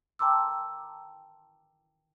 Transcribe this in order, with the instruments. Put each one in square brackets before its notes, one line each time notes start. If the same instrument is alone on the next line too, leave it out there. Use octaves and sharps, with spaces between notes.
[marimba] G5 A5 A#5 C6 D6 E6